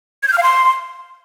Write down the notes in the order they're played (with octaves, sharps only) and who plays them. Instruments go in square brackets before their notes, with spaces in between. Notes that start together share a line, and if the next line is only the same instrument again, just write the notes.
[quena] G#6
G6
F6
F5
C6